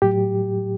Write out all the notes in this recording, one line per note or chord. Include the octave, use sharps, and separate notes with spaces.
A2 F#3 G4